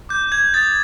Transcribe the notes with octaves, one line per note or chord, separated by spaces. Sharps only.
D6 G6
G#6
D#6 G6 A6